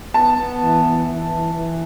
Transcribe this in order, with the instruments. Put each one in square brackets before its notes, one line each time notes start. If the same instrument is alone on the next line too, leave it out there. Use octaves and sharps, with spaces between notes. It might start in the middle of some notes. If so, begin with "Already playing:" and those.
[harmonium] B3 [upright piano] A5
[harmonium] B3
E3
E3
E3
E3
E3